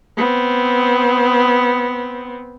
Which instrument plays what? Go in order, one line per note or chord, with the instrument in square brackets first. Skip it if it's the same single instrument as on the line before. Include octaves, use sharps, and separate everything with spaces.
[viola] B3 C4